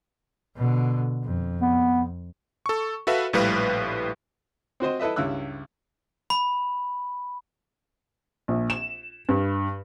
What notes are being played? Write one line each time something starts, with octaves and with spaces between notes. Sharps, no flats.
B2 D3
F2
B3
A4 C#6
F#4 A4 B4 E5 F5
A#1 A2 G3 B4 F5
C4 F#4 C5 D#5
E4 A4 B4 D#5 E5
C#2 G2 E4 E6 F#6
B5
A#1
E7
G2